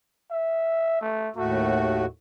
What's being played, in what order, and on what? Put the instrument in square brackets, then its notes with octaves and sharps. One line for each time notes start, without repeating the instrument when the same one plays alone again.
[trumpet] E5
A3
[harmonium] D#2 A2 F#4 [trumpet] A3